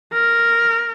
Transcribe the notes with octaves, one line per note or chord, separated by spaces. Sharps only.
A#4